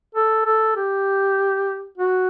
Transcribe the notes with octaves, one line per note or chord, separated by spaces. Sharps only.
A4
A4
G4
F#4